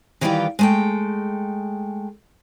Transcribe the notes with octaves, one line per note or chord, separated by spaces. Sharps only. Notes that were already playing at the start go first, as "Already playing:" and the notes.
D#3 E3 G3 E4 F4 G4
G#3 A3 G5